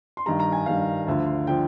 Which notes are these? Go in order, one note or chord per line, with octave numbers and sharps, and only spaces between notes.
C6
G2 D#3 G3 A#5
A#5
G#5
G2 D#3 G3 F5
D2 D3 F3
D3 F3 G5